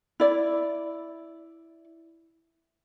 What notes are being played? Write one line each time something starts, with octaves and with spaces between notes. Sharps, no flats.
E4 D5